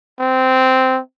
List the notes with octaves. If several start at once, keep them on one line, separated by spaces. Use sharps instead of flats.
C4